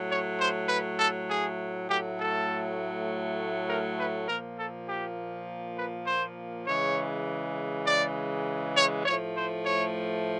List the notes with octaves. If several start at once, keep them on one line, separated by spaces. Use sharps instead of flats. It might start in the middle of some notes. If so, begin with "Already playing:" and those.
Already playing: A2 F#3 A3
C#5
C5
B4
A4
G#4
A2 F#3 A3 G4
A4
A#4
B4
A#2 F3 A#3 A#4
A4
G4
B4
C5
C#3 E3 G#3 C#5
D5
C#5
A2 F3 A3 C#5
C5
C#5